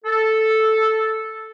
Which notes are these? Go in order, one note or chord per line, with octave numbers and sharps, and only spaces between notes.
A4